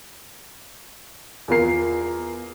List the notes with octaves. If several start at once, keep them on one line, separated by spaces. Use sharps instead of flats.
E2 F4 A#4 C7